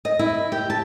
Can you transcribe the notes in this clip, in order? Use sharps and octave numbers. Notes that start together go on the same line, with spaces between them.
D#5
E4
G4
A5